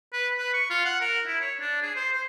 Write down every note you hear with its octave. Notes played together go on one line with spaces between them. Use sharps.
B4
B4
C#6
F4
F#5
A#4
E4
C#5
D4
G#4
C5
C5